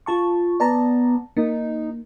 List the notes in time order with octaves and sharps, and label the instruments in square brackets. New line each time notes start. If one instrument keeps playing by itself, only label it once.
[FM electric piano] F4 A5 C#6
[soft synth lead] B3 [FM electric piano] D5 A5 A#5
[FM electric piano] A#3 [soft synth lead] D#4